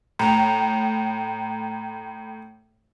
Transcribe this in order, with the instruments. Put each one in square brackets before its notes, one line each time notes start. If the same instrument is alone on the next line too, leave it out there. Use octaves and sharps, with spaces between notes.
[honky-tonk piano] A2 [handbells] G5 A#5